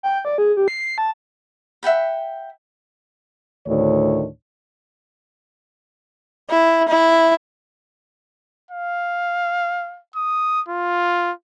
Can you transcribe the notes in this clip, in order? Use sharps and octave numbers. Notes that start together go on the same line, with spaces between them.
G5
D5
G#4
G4
C7
A5
E5 F#5 G5 B5
D2 A2 D#3 D4 C#5
E4
E4
F5
D#6
F4